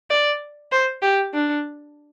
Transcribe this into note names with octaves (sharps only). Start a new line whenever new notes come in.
D5
C5
G4
D4